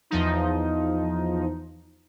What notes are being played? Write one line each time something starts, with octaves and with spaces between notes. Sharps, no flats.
E2 F3 D#4